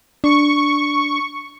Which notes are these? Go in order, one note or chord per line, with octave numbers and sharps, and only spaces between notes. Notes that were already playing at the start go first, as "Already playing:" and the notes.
D4 C#6